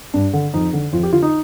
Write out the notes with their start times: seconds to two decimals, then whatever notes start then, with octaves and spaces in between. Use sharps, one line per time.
0.14 G2 D4
0.33 D3
0.54 F2 D#4
0.73 D3
0.93 F2 F4
1.03 G4
1.12 D3 F4
1.22 D#4